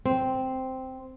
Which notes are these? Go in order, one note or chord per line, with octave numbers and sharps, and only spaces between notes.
C4